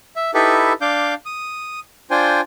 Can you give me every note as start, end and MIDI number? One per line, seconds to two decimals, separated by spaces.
0.16 0.31 76
0.34 0.73 63
0.34 0.73 64
0.34 0.73 67
0.34 0.73 69
0.34 0.73 71
0.34 0.73 76
0.81 1.14 62
0.81 1.14 77
0.81 1.14 86
0.81 1.14 91
1.26 1.80 87
2.11 2.41 62
2.11 2.41 65
2.11 2.41 72
2.11 2.41 79
2.11 2.41 80